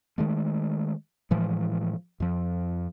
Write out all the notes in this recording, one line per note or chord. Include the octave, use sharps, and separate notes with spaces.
D#3 G#3 A3
A2 E3 F3 G#3
F2 F3